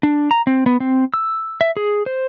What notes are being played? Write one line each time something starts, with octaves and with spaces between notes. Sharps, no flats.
D4
A#5
C4
B3
C4
E6
E5
G#4
C5